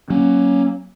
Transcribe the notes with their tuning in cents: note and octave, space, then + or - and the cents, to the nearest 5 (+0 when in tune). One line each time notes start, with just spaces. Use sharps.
F#3 +20 A#3 +20 C#4 +0